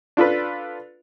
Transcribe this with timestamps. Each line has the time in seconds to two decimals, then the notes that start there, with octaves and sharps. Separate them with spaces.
0.17 D4 F4 A4 B4